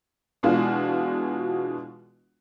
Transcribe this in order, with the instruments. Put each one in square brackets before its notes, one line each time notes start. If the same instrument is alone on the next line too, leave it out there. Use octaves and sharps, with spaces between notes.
[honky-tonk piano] B2 E3 G#3 D4 F4 F#4